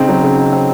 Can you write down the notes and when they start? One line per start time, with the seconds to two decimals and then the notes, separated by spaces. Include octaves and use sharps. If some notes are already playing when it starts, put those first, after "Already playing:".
Already playing: C#3 C4 D#4
0.09 F#3
0.23 C#3
0.38 D#4
0.53 C4